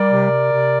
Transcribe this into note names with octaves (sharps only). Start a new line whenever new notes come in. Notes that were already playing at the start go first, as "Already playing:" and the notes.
Already playing: G3 A#4 D5
C3
C3
C3